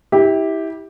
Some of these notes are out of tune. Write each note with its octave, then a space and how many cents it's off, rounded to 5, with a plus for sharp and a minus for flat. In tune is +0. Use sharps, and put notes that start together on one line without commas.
E4 -25 G4 +0